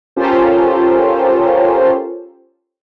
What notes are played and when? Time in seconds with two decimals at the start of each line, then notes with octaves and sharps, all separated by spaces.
0.16 C#4 F4 G4 A4 A#4 C5